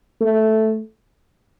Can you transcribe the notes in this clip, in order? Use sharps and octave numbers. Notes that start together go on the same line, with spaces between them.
A3